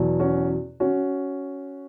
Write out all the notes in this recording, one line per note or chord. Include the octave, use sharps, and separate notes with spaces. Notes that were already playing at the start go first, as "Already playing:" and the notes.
Already playing: E2 B2 F#3
C#4 F#4
C#4 F#4